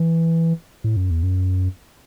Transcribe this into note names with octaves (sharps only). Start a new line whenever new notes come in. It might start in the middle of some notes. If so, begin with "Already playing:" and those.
Already playing: E3
A2
F#2
E2
F#2